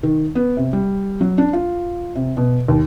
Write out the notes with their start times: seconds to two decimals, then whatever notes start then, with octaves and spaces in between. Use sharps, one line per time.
0.03 D#3
0.35 B3
0.57 C3
0.73 G3
1.21 F#3
1.38 D4
1.53 F4
2.15 C3
2.37 B2
2.68 D#2